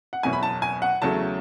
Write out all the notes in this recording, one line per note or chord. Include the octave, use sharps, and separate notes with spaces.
F#5
F#1 E2 B2 F#3 G#5
B5
A5
G#5
F#5
E2 C#3 F#3 A3 C#4 A5